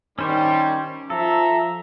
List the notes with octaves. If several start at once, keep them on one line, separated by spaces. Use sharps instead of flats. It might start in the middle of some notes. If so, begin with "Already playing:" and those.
D#3 G3 C#4 C5 C#5
F3 A4 E5 A#5